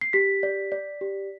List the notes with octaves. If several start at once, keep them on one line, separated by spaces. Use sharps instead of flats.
C7
G4 B6
D5
D5
G4